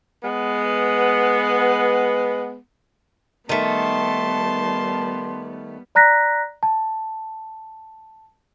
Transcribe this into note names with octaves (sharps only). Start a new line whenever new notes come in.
G#3 B3
D#3 G3 A3 B3 A5 C6
D5 A#5 F#6 A#6 B6
A5